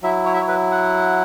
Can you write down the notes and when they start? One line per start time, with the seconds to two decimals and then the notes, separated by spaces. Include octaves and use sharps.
0.03 F#3 E4 E5
0.25 C#5
0.34 E5
0.41 C#5
0.48 B4
0.72 F#5